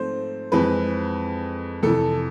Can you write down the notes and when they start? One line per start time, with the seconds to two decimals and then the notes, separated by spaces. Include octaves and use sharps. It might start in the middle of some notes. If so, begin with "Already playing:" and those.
Already playing: G#2 F3 A3 C4 C5
0.52 F2 E3 G#3 C4 B4
1.83 F2 C3 E3 A4